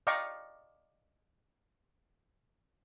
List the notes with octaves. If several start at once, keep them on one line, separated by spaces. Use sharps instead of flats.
D5 D#5 F5 G5 A#5 C#6